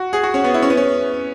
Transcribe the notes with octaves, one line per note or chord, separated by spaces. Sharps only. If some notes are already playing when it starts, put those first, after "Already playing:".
Already playing: F#4
G#4
F#4
C#4
B3
E4
C#4
B3
C#4